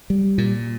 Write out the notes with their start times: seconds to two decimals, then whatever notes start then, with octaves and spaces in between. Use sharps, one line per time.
0.10 G3
0.38 A#2